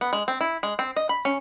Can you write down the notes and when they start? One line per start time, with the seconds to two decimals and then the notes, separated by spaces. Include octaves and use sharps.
0.01 B3
0.13 G#3
0.28 C4
0.41 E4
0.63 G#3
0.79 C4
0.96 D#5
1.09 B5
1.25 C#4